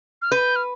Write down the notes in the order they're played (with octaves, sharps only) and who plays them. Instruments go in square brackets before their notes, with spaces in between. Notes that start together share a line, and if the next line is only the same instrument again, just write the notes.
[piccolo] F6
[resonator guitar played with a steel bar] B4 [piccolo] G6
[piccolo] F6